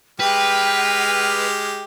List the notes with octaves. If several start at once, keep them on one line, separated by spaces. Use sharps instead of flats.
G#3 G4 B4 G5 F6